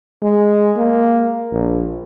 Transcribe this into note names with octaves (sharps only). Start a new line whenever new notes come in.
G#3
A#3
A#1